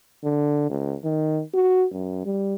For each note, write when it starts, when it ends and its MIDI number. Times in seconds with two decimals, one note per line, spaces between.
0.24 0.69 50
0.70 0.96 37
1.04 1.41 51
1.54 1.86 66
1.93 2.23 42
2.25 2.55 55